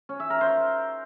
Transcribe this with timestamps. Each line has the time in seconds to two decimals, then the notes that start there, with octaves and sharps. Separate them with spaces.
0.09 C#4
0.20 E5
0.30 A#4
0.41 C5